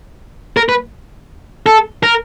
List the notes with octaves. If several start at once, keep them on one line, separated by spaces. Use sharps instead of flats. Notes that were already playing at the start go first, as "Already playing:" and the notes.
A#4
B4
A4
A#4